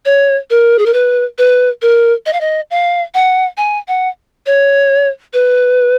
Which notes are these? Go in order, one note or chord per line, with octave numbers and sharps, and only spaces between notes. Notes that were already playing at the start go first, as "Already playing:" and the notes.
C#5
A#4
G#4
A#4
B4
B4
A#4
D#5
F5
D#5
F5
F#5
G#5
F#5
C#5
B4